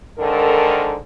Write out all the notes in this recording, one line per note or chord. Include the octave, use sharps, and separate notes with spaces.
G#2 D3 D#3 A4 A#4